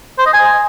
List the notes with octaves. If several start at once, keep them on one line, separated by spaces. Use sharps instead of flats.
C5
D#5
G#5